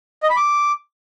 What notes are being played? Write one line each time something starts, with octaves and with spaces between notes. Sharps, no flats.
D#5
B5
D6